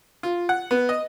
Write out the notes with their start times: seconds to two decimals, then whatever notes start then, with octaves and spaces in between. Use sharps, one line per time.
0.23 F4
0.49 F#5
0.71 B3
0.89 D#5